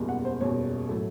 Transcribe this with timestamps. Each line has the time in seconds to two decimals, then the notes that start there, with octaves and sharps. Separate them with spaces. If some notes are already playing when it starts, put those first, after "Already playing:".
Already playing: F#1 E2 B2 G3
0.09 F#5
0.25 C5
0.41 F#1 E2 B2 G3 C#5
0.89 A2 F#3 A3